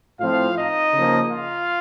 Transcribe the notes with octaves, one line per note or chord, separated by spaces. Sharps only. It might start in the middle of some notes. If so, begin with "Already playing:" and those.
A2 F3 C4 F4 F5
D#4 D#5
C#3 F3 A#3
F4 F5